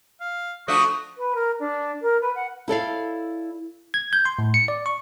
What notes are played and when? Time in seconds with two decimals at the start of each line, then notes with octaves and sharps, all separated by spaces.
0.21 F5
0.68 F3 A3 D4 F#4 C#6 D#6
1.17 B4
1.35 A#4
1.59 D4
2.02 A#4
2.21 B4
2.35 F#5
2.68 E4 A4 D5 F5
3.94 G#6
4.13 G6
4.25 C6
4.39 A2
4.54 C#7
4.68 D5
4.86 C#6